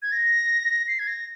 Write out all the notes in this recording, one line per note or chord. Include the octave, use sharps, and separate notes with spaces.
G#6
A#6
C7
G#6
A#6